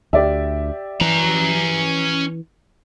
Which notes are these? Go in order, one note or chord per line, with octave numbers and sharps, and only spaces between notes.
D2 G4 D5 E5
E3 C#4 A#5